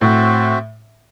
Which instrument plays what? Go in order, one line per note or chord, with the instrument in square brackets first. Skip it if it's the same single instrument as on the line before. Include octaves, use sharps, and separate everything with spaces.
[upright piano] A2 [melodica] C4 F#4 C5 E5